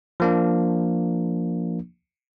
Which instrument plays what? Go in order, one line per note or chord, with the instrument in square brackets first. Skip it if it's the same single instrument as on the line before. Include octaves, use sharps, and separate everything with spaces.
[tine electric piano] F3 A#3 D4